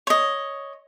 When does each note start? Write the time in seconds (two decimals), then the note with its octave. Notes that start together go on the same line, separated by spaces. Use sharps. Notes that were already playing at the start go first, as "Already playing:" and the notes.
0.07 C#5 D#5